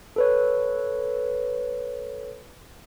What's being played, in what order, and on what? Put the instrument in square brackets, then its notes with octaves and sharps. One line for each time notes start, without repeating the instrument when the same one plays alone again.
[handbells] A4 B4 C#5